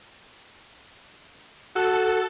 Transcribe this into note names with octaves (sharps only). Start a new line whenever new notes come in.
F#4 A4